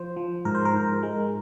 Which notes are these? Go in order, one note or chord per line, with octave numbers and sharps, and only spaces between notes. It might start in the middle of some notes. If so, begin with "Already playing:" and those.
Already playing: F3 C5
F3
G#2 A#4
C5
A#4
G#2
G#3